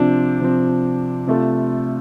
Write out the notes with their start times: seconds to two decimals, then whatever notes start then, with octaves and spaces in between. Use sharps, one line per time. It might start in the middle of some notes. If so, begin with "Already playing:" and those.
Already playing: C3 F3 C4 D4
0.40 C3 F3 C4
1.27 C3 A3 F4 A4